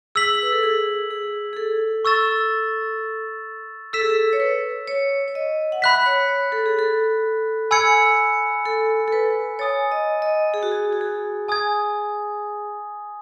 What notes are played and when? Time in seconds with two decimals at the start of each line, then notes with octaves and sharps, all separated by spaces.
0.15 G#4 E6 B6 F#7
0.43 B4
0.52 A4
0.63 G#4
1.11 G#4
1.53 G#4
1.57 A4
2.05 C#6 E6 A6 E7
3.93 A4 E6 B6 E7
4.01 G#4
4.10 A4
4.33 C#5
4.40 B4
4.87 C#5
5.28 C#5
5.35 D#5
5.72 F#5
5.82 E5 B5 F#6 B6
6.06 C#5
6.29 C#5
6.52 A4
6.66 G#4
6.79 A4
7.71 G#5 B5 E6 G#6 C#7
8.65 A4
9.08 A4
9.12 B4
9.59 C#5 G#5 D#6 A6
9.92 D#5
10.22 D#5
10.54 G#4
10.63 F#4
10.72 G#4
10.93 F#4
11.01 G#4
11.48 G#5 D#6 G#6